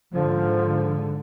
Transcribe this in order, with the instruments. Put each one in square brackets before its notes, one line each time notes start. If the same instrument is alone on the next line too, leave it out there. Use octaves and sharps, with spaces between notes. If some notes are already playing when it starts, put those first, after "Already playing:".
[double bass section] G#2 D3 [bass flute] F3